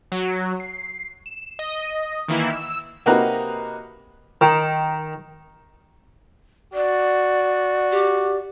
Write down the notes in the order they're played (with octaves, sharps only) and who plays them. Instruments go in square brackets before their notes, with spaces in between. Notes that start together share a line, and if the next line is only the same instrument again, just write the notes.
[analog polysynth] F#3
C7
E7
D#5
D#3 E3 A#3 E4
E6
[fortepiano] C3 A#3 D#4 F#4 B4 A#5
[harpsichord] D#3
[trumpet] F#4 [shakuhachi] D5
[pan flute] G4